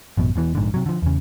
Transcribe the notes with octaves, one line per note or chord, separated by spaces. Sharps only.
A1 F#2 B2
E1 B2 E3
A#1 G#2 D3
C3 F#3
D3 F3
E2 C#3